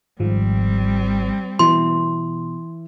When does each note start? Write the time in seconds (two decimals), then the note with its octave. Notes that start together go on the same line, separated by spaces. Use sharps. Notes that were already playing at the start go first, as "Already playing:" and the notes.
0.20 G#1 G#2 F3 G3 C4
1.59 B2 E3 C6